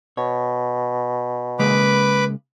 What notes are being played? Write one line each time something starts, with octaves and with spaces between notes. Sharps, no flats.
B2 C#5
C#3 G#3 A#3 B4 B5 D6